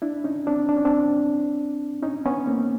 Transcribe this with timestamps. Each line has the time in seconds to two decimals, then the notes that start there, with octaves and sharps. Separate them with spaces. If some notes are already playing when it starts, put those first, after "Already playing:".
0.02 D4 E4
0.24 C#4 D#4
0.47 C4 D4
0.69 D4
0.77 C#4
0.85 C4 D4
2.03 C#4 D#4
2.26 B3 C#4
2.47 A#3 C4